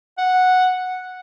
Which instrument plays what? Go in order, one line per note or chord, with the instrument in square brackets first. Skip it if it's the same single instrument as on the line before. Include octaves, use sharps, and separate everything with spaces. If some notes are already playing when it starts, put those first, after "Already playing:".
[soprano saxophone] F#5